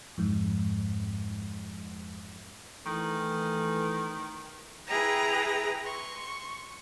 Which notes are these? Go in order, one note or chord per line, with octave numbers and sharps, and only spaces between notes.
F2 G#2
D#3 E3 A3
E4 G#4 B4 G5 A#5
C6 C#6